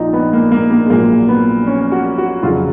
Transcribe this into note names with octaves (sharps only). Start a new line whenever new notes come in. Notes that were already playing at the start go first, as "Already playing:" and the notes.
Already playing: A#1 A#2 F3 D#4
B3
A#3
A#3
A#3
G#3
A#1 A#2 F#3 A#3
B3
C#4
F#4
F#4
F1 F2 C#3 F#3 F4